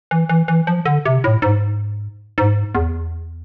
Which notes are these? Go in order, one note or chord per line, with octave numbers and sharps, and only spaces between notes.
E3
E3
E3
F3
D3
C3
A2
G#2
G#2
E2